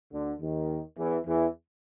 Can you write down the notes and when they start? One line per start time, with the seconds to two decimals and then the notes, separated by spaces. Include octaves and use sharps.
0.12 D2 D3
0.40 D#2 D#3
0.97 E2 E3
1.26 E2 E3